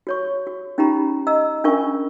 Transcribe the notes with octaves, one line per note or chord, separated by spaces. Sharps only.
F#4 C#5 C#6
F#4
C#4 D#4 F4 G4 A#5 B5
D#5 A#5 E6
C#4 D4 F4 A#4 G#5 C#6